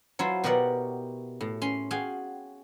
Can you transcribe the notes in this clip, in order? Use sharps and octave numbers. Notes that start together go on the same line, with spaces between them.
F#3 E4 F4 C5
B2 F#4 G4 A#4 D5 F#5
A2
C#4 C6
F#4 G#4 F5 G5